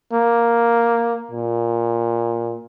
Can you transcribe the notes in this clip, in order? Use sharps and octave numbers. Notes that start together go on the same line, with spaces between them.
A#3
A#2